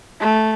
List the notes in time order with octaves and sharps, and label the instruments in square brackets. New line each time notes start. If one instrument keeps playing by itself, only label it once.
[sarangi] A3